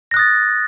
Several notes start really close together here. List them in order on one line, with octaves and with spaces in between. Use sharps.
A#6 F#6 D#6 A6